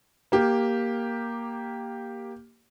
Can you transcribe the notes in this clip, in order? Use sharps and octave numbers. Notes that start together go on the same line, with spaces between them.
A#3 G4